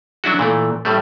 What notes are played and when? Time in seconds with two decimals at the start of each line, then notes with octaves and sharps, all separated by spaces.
0.24 F#3 D4 E4 F#4
0.39 A#2 E3 A3
0.85 A2 G3 A3